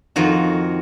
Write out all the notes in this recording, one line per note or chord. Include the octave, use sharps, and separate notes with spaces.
F2 D#3 F4 F#4